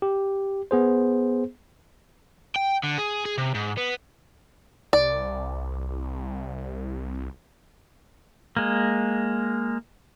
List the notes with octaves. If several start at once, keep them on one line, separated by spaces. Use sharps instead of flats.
G4
B3 G#4 C5
G5
D3
G#4
G#4
C3
G#2
B3
C2 D5
G#3 A#3